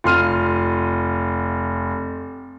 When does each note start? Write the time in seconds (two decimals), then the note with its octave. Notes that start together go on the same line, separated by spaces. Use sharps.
0.04 F1 F4 C6 F6 D#7